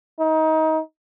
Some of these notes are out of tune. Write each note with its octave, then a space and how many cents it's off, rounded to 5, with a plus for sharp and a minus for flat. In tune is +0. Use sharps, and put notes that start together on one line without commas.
D#4 +25